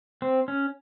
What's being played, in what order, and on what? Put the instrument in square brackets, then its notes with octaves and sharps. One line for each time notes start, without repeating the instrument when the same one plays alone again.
[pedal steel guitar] C4
C#4